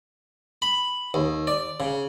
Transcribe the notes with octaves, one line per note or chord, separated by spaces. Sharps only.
B5
D#2
D5
C#3